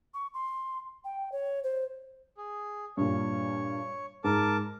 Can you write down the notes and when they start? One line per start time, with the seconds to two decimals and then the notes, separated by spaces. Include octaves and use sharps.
0.14 C#6
0.34 C6
1.04 G5
1.32 C#5
1.64 C5
2.37 G#4
2.97 G2 A#2 C#5
4.24 G#2 A#4 A5 D6